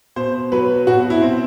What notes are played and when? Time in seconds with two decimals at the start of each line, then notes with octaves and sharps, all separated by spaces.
0.16 B2 C5
0.52 F#3 B4
0.87 B2 F#4
1.10 E4
1.22 C4